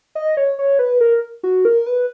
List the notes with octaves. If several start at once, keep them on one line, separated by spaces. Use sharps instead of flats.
D#5
C#5
C#5
B4
A#4
F#4
A#4
B4